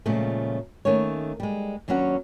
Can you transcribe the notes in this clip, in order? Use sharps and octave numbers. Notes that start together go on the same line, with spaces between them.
A#2 C#3 F3 G#3 A3
D#3 A3 A#3 C#4 C#5
G3 G#3
D#2 F#3 B3 C#4 D4 F#5